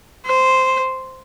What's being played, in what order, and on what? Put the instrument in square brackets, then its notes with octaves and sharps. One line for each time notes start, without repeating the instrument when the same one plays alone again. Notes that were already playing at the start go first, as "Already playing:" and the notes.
[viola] C5